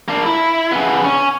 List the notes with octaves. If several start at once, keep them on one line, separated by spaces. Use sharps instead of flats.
A#3 D4
E4
C#3 B3
C#4